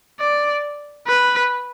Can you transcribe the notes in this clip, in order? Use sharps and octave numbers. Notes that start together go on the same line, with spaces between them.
D5
B4